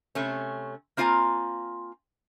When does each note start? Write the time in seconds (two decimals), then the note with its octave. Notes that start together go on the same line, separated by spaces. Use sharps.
0.15 C3 A3 C#4
0.97 A#3 C4 F4 D5 G#5 A#5